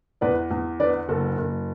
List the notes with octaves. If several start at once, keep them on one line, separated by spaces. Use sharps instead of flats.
E2 B4 D5
E2
D3 B4 D5
F#1 A4
F#1